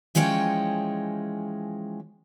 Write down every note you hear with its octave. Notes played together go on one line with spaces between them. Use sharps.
E3 F3 G#3 C#4 C#5 G5